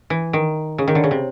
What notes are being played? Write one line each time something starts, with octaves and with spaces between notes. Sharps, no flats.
E3
D#3
C#3
D#3
D3
C#3
C3